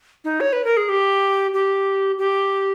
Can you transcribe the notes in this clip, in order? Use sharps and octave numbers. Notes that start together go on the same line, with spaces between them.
D#4
C#5
B4
A#4
G#4
G4
G4
G4